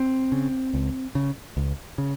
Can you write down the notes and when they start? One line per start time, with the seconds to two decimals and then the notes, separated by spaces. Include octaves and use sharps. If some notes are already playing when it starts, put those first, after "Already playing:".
Already playing: C4
0.32 C#3
0.74 C#2
1.15 C#3
1.57 C#2
1.98 C#3